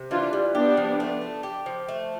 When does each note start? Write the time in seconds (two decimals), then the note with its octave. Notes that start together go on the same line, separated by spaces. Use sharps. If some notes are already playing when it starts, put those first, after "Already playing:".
Already playing: C3
0.11 E3 D4 F4
0.33 G3
0.55 B3 D4 G4
0.77 F3
1.00 A3
1.21 D4
1.43 G4
1.66 F3
1.88 A3